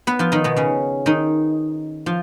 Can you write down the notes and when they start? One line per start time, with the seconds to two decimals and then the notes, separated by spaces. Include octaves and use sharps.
0.07 B3 B4
0.19 F3 F4
0.32 D#3 D#4
0.44 B2 B3
0.56 C#3 C#4
1.06 D#3 D#4
2.06 F3 F4